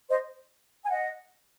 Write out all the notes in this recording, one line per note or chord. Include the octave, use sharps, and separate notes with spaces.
C5 D#5
G#5
D#5 F#5